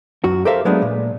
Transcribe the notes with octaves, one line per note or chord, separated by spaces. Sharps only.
F#2 F#4
G4 A4 A#4 C5 E5 F5
F#3 G#3 A3 B3 D4
A#2